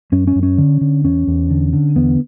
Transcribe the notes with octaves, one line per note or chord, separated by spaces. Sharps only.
F#2 C#4
C#4
F#2
C#4
D3
D3
E2 C#4
E2
D3
D3
E2 B3